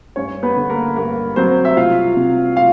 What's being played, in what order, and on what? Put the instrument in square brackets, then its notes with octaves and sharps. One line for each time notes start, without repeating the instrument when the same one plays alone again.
[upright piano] G2 C#4 C#5
B3 B4
D3
A#3 A#4
G2 A#3 A#4
F#3 C4 C5
E5
C2 F4 F5
C3
F4 F5